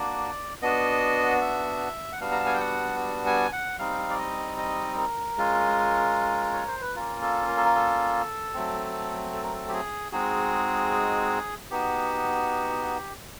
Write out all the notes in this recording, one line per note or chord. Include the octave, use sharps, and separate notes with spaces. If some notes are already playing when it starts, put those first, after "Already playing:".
Already playing: A#3 D4 F#4 D5
B3 D4 F#4 D#5
E5
F#5
G3 B3 D4 F#4 F5
A#5
A5
G#5
G5
F#5
G#5
F#5
G3 C4 D#4 F5
D5
D#5
D#5
A#4
G#3 C#4 F4
C#5
C5
B4
A#3 C#4 F4 A#4
A4
A#4
A4
A#4
A4
F#3 A3 C4
A4
A#4
A4
G4
G#4
G#3 C4 D#4 F#4 G#4
B3 D#4 F#4 G4